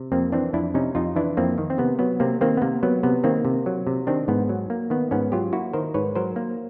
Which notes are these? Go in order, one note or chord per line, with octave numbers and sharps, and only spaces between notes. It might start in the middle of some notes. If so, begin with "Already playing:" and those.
Already playing: C3
F2 A#3 C4
E3 C4 D4
F2 D4 E4
C3 C#4 D#4
F2 D#4 F4
E3 D4 E4
F2 A#3 C4
D#3
C4
C3 B3
F#3 B3
C3 A#3 C4
D#3 A#3 C4
B3
C3 A#3
F#3 B3
C3 B3
D#3 A#3 C4
C3
F#3
C3
D#3 C4 D4
G#2 B3
F#3
A#3
D#3 B3
G#2 B3 C#4
F#3 F4 G4
A#3 E4 F#4
D#3 A#4 C5
G#2 B4 C#5
F#3 A#4 C5
A#3